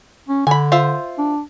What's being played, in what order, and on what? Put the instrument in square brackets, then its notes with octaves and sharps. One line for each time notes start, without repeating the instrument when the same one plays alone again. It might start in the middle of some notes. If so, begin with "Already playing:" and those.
[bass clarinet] C#4
[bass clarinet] D3 [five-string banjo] G#5 B5
[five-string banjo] F4 C5 E5
[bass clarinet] D4